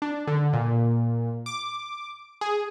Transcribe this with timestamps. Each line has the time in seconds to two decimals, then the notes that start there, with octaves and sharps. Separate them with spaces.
0.02 D4
0.27 D3
0.53 A#2
1.46 D6
2.41 G#4